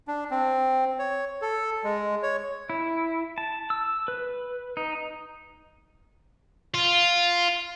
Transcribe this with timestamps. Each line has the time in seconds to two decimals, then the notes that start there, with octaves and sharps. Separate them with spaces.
0.08 D4
0.31 C4
0.99 C#5
1.41 A4
1.84 G#3
2.23 C#5
2.70 E4
3.38 A5
3.70 E6
4.08 B4
4.77 D#4
6.74 F4